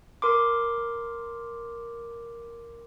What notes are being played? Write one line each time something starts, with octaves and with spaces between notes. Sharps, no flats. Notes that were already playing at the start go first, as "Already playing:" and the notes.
A#4 C6 D6